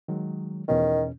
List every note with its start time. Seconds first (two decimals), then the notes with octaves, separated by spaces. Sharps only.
0.08 D#3 F#3 G#3
0.68 E2 B2 D#3 C#4